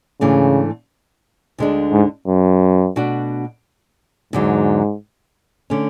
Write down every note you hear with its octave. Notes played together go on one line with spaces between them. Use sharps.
G#2 C#3 E3 A3 D4
D2 D3 G#3 D4
G#2
F#2
B2 A3 D4 F#4
E2 G#2 D3 F#3
D3 A3 C#4